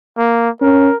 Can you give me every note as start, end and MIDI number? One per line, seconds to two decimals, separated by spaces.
0.18 0.50 58
0.62 0.89 61
0.62 0.96 70